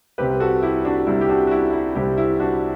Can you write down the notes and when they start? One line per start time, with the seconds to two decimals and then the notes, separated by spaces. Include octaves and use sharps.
0.18 C2 C3 G3 C4 G4 B4
0.40 F#4 A4
0.63 E4 G4
0.85 D4 F#4
1.07 C2 C3 G3 C4 E4
1.21 G4
1.29 D4 F#4
1.47 F#4
1.51 E4
1.73 E4
1.95 C2 C3 G3 C4 E4 G4
2.18 E4
2.40 D4 F#4